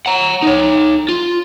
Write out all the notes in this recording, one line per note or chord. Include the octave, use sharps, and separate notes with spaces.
F#5 A#5
D#4 C#5
F4